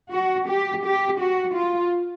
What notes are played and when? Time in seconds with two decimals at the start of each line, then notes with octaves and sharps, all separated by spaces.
0.11 F#4
0.46 G4
0.83 G4
1.18 F#4
1.54 F4